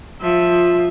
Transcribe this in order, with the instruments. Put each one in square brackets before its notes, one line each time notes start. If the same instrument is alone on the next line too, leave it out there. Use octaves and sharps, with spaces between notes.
[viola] F3 E5